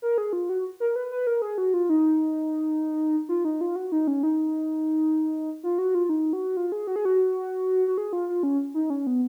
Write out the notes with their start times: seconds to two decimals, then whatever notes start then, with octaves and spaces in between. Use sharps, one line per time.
0.02 A#4
0.18 G#4
0.33 F4
0.49 F#4
0.80 A#4
0.96 B4
1.12 B4
1.27 A#4
1.42 G#4
1.58 F#4
1.74 F4
1.89 D#4
3.29 F4
3.45 D#4
3.61 F4
3.76 F#4
3.92 D#4
4.07 C#4
4.23 D#4
5.64 F4
5.78 F#4
5.95 F4
6.09 D#4
6.33 F#4
6.57 F4
6.72 G#4
6.87 F#4
6.96 G#4
7.05 F#4
7.88 F#4
7.98 G#4
8.13 F4
8.29 F4
8.43 C#4
8.74 D#4
8.90 C#4
9.07 B3